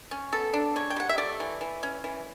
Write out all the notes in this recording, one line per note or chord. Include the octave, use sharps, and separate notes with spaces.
C#4
B3 A4
D4
C#3 C#5
G5
G3 F#5
E5
A3 D5
E3
E3
C#4
E3